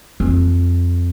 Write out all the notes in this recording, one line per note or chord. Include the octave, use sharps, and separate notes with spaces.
F2